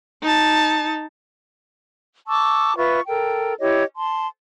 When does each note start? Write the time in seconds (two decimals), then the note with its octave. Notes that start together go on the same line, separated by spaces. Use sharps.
0.23 D#4 A5
2.28 A5 C#6 D6 E6
2.76 F4 B4 E5 C#6
3.07 A4 A#4 G5
3.60 E4 G4 C#5 D#5
3.96 A5 C6